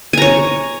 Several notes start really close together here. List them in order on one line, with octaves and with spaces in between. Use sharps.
G#5 A#5 C#5